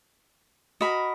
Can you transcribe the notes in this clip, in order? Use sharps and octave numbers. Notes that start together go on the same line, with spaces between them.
F#4 A#4 D#5 B5